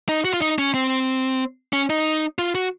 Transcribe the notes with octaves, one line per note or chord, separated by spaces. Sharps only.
D#4
F#4
F4
D#4
C#4
C4
C#4
D#4
F4
F#4